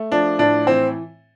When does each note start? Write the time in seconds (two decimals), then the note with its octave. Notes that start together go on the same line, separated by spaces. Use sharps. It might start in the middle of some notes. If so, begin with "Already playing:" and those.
Already playing: A3
0.12 F3 D4
0.39 A2 D4
0.67 E3 C4